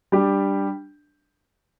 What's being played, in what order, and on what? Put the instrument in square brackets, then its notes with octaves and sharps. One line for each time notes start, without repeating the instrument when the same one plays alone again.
[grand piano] G3 D4 G4